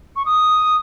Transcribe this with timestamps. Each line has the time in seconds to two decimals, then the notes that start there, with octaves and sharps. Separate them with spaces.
0.16 C#6
0.26 D#6